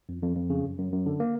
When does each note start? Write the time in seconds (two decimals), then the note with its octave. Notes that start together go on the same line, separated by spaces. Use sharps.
0.09 F2
0.22 F2
0.36 F2
0.50 C#3
0.64 F#2
0.78 F#2
0.92 F#2
1.06 D3
1.20 A#3